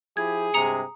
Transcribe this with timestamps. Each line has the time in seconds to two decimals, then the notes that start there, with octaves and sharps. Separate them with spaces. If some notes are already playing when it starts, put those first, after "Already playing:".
0.17 F3 E4 G4 G#4 G#6
0.54 G2 C3 G#3 A#5 D#6 C#7